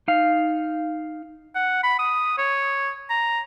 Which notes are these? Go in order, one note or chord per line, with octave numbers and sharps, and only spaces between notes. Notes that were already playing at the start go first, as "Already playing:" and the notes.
D#4 F5
F#5
B5
D#6
C#5
A#5